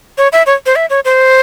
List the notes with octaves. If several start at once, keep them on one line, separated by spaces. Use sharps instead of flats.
C#5
E5
C#5
C5
E5
C#5
C5